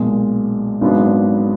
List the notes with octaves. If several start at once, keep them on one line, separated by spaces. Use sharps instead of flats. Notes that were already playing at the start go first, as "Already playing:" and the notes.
Already playing: B1 A#2 G#3
G#1 G#2 F#3 B3 D4